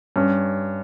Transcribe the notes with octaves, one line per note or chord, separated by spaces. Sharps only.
G2 C#4